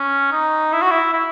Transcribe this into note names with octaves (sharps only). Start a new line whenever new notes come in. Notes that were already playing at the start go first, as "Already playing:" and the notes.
Already playing: C#4
D#4
E4
F#4
E4
E4